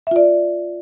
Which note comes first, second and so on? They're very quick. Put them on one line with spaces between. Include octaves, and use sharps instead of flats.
E5 F4 D5